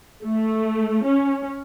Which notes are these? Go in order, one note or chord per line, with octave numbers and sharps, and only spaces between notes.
A3
C#4